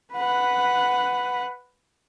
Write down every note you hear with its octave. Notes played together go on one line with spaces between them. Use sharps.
B4 F#5